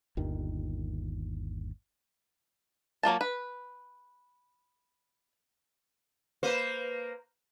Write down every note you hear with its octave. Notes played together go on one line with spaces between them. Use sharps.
G1 D#2 D#3
F#3 A#3 F4 A5
B4
A#3 B4 C5